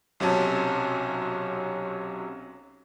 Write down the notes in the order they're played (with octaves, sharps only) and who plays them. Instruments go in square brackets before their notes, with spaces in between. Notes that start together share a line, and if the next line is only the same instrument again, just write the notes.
[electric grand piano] B1 C3 F#3 C#4 A5